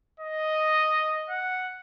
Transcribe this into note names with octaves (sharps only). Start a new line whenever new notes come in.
D#5
F#5